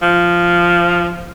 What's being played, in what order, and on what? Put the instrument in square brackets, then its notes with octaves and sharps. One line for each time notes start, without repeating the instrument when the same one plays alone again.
[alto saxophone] F3